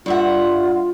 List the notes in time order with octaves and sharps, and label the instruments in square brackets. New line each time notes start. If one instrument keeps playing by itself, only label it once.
[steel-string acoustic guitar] G2 E5 F#5 [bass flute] F4